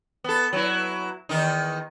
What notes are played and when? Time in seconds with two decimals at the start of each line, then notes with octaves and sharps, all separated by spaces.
0.24 B3 A4
0.53 F#3 E4
1.29 E2 D#3 D#4